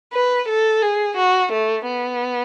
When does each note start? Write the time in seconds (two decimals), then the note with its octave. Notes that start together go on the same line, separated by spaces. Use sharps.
0.13 B4
0.48 A4
0.82 G#4
1.17 F#4
1.52 A3
1.86 B3